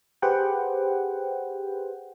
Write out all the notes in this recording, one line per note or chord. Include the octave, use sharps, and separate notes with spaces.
G4 G#4 B4 C5 F#5 G5